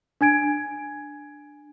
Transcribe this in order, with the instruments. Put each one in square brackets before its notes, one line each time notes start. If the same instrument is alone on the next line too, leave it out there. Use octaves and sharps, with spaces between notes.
[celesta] D4 G#5 G#6 D7